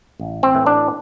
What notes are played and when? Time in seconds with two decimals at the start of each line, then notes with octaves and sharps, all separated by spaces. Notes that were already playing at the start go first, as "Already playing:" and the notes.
0.20 A1
0.43 C4
0.55 A2 E3
0.66 D4